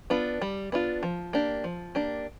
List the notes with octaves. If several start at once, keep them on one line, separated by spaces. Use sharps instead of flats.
B3 D4 F4
G3
B3 D4 F4
F3
A#3 D4 G4
F3
A#3 D4 G4